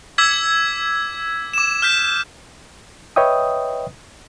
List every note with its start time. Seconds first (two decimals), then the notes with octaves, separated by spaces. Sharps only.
0.18 D6 E6 G#6 B6
1.53 D6 E7
1.82 F6 G6 B6
3.16 B4 C#5 D#5 E5 G5 D#6